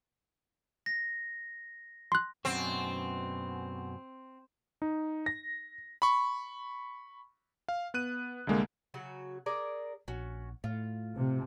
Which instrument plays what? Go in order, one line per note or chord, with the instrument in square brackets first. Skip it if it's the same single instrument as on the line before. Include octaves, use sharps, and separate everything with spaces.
[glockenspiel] A#6
[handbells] C6 F#6
[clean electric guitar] F#2 B2 F#4 [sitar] C4
[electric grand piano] D#4
A#6
B5 C#6
F5
B3 F#6 D#7
C2 D3 G#3 A#3
[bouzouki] C#3 F#3 F#4
G#4 A#4 D5
[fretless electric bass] A#1 [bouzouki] C#4 F#4
[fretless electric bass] A2 [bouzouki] F4
[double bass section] C3